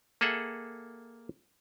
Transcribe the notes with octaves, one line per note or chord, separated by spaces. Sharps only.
A#3 G#4 A4 E5 F#5